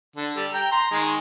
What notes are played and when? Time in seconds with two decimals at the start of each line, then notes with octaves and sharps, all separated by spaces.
0.16 D3
0.36 G3 A4
0.53 G5 A#5
0.72 A#5 C6
0.92 D#3 G#3